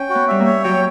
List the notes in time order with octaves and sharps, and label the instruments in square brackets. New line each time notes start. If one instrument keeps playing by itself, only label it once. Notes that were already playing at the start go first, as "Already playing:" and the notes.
Already playing: [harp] C#4 [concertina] G5
[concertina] F#4
[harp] B3
[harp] G3 [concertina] E5
[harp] A#3
[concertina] C#5
[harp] F#3 [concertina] G5